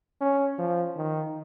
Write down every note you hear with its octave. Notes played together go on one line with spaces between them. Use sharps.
C#4
F3
D#3